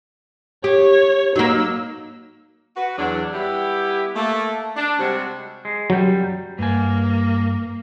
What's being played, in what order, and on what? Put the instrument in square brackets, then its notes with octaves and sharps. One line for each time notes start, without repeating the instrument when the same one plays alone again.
[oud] G4 [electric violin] C#5
[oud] F#3 A#3 [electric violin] D#4 E6
[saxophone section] F#4 B4
E2 F#3 D4
G3 B3 E4 G4
A3 A#3
D4
C3 G3 G#3 C4 F#4 F#5
[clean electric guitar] G#3
[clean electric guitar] F#2 G3 [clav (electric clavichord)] F#3
[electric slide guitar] G2 G#5 [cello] A#3